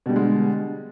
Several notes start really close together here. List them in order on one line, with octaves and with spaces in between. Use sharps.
B2 G3 D3 G#3